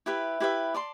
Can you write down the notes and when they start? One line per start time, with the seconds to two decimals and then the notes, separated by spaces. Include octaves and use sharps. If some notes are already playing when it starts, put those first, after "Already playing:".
0.06 E4 G4 B4 E5
0.40 E4 G4 B4 E5
0.74 D5 A5 C6